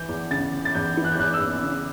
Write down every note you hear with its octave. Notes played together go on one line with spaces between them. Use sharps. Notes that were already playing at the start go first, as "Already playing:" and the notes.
Already playing: E3 G6
E2
C#3 A6
C#3
A6
E2 G6
E3
F#6
G6
E2 F#6
E6
E2
C#3